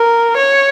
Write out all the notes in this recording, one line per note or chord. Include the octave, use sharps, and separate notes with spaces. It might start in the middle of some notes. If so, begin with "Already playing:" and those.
Already playing: A#4
C#5